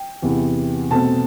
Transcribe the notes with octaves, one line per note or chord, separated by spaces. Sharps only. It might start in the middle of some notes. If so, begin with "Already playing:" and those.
Already playing: G5
E2 C3 E3 B3
B2 A3 C4 A5